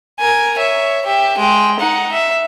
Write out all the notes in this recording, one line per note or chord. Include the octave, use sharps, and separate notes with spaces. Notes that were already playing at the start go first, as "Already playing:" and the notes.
A#4 G#5
C#5 E5
G4 E5
G#3 G5
D#4 F#5
E5